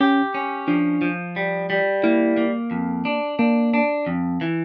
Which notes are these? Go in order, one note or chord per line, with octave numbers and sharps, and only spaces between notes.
C#4 G4
C#4
F3 D4
F3
G3
G3
A#3 E4
A#3
F2
D4
A#3 D4
D4
F2
E3